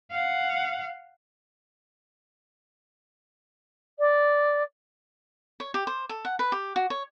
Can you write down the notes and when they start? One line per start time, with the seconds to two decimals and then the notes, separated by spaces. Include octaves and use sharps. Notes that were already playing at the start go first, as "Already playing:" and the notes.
0.11 F5 F#5
3.99 D5
5.60 C#5
5.74 G4
5.87 C5
6.09 A4
6.25 F#5
6.39 B4
6.52 G4
6.76 F#4
6.90 C#5